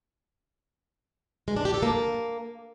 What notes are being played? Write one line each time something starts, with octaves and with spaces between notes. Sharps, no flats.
G#3
D4
G4
A4
A#3